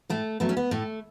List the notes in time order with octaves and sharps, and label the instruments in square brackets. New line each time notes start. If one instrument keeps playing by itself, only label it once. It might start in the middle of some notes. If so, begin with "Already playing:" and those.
[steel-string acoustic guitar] A2 A3
F#3 A3 B3
C#4
B3
A2 A3